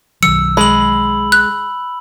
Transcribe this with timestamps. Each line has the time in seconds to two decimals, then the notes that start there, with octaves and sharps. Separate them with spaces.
0.23 B1 D#3 F#3 E6 C#7
0.57 G#3 B5 F#7
1.32 F#6